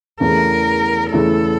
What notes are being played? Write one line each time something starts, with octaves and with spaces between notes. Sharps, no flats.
E2 C#3 E3 A3 A#4
E2 C#3 E3 A3 A4